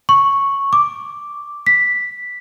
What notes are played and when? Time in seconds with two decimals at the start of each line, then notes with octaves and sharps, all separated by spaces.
0.09 C#6
0.73 D6
1.67 B6